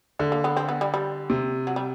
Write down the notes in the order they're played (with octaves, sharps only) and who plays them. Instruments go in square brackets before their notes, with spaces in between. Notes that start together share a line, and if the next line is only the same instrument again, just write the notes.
[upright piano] D3 [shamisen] A3
[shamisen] A#3
B3
C4
B3
G3
G3
[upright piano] C3
[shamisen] F#3
G3